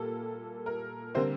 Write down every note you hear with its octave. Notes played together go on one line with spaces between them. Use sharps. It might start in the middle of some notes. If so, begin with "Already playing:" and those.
Already playing: A#2 G3 A#3 A4
A#4
D3 G3 A#3 C4 C5